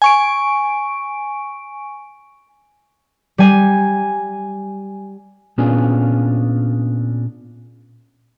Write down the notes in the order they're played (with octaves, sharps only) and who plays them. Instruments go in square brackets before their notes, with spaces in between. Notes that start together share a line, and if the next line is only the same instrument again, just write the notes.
[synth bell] G#5 C#6 D7
[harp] G3 G#5
[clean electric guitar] A#2 B3 C#4 D4 F4 G#4